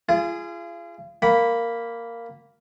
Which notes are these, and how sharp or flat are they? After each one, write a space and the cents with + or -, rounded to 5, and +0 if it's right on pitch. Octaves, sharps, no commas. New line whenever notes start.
F4 -35 G#4 +0
A#3 -5 F#5 +40 B5 +0